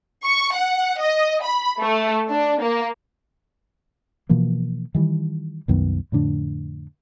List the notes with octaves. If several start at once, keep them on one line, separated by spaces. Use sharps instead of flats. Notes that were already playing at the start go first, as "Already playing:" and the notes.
C#6
F#5
D#5
B5
A3
D4
A#3
B2 E3 F3 A#3
D#3 E3 G3
C2 F#2 D#3 B3
F2 A2 D3 D4